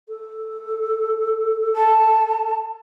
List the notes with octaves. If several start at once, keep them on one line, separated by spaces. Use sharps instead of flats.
A4
A5